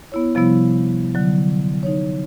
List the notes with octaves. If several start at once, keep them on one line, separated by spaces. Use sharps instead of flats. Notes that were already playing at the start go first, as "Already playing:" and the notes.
B3 E4 C#5
C3 F3 G3 B3 E4
D3 F#3
D#4 C#5